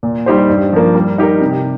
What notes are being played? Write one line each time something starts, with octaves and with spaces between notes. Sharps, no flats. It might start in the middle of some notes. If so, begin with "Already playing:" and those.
A#2
G3 D#4 G4 C5
G2
F3 A#3
G3
D#4 G4 A#4
C3